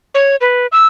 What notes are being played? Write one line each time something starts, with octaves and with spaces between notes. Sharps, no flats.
C#5
B4
E6